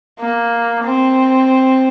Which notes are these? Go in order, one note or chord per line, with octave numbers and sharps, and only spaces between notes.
A#3
C4